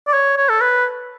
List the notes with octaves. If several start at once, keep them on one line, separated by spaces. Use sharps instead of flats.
D5
C#5
C#5
A4
B4